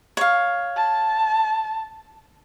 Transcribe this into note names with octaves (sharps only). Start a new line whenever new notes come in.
C#5 F5
A5